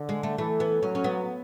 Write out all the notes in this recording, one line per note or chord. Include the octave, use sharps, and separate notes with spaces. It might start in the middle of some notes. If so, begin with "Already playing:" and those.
Already playing: D3
G#3
A3
E3 A3
B3
F#3 C#4
C#4
B3